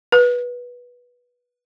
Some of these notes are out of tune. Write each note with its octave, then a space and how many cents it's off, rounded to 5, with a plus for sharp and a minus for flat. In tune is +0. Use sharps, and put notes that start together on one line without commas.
B4 -15